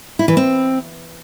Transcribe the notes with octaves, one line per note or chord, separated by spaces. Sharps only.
E4
E3
C4